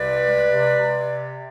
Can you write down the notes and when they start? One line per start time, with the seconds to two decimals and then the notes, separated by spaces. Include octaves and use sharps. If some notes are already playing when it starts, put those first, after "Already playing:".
Already playing: C2 C3 B4 D5
0.21 G#3
0.51 C3
0.80 C3